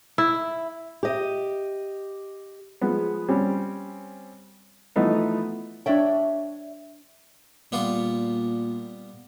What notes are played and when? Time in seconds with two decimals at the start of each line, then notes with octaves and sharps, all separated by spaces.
0.18 E4
1.03 G4 D#5
2.81 F3 G#3 B3
3.29 G3 C4 C#4
4.96 E3 F3 A3 B3 D#4
5.86 D4 C#5 D5 E5 G5
7.72 A#2 G3 B3 F4